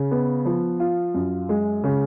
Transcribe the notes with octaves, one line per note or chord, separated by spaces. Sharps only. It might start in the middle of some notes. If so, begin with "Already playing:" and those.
Already playing: C#3
B3
F3
F4
F#2
G#3
C#3